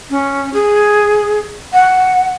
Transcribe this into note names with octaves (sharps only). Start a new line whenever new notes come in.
C#4
G#4
F#5